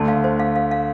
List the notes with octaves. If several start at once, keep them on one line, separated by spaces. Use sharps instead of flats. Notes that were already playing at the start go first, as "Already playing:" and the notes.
Already playing: D2 D3 A5
F5
C5
F5
F5
F5